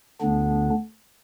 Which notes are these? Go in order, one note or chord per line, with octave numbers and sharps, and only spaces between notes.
D2 D3 B3 D4